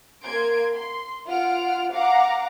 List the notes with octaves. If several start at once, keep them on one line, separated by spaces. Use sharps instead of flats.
A#3 C6 G#6 D7
C6
F4 F#5 F6 D7
F5 F#5 A#5 D6